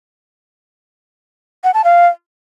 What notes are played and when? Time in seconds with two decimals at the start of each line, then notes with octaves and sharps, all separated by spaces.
1.64 F#5
1.74 A5
1.84 F5